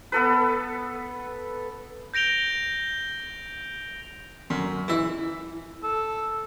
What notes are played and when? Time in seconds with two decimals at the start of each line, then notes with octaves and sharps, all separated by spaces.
0.12 B3 A4 B4
2.14 G6 A#6 D7 F7 G7
4.50 F#2
4.88 E3 E4
5.83 A4